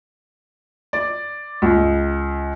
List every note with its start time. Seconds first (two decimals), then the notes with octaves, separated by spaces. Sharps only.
0.93 D5
1.62 C#2